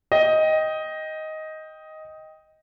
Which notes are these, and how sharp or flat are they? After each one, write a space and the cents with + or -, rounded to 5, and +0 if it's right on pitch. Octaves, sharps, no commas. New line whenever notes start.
D#5 +10 G5 +0